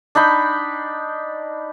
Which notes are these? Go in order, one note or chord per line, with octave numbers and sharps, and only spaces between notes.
D4 D#4 G5 B5